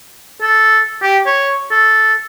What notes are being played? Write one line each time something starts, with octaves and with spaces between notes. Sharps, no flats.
A4
G4
C#5
A4